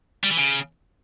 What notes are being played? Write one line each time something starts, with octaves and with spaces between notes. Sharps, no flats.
G3
E3
C#3